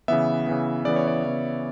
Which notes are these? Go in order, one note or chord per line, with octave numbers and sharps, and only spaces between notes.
C#3 E3 B3 E5
C#3 E3 B3
C#3 E3 B3 D5
C#5
D5
C#3 E3 B3